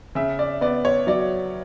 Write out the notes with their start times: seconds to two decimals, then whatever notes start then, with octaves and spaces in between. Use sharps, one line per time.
0.15 C#3 E5
0.39 D5
0.61 B3 D5
0.85 C#5
1.07 F#3 D5